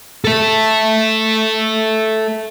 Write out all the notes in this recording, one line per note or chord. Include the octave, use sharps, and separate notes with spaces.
A4 E5